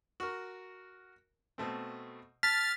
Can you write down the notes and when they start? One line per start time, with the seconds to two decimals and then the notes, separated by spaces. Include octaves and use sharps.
0.20 F#4 A#4
1.58 B2 A3 C4
2.43 A5 F6 A6 B6